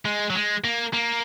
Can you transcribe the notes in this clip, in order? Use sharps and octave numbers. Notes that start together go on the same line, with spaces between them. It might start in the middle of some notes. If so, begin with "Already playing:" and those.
G#3
F#3
G#3
A#3
A#3